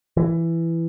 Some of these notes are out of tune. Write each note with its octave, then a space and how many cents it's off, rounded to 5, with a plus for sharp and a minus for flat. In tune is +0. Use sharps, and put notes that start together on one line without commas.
E3 +10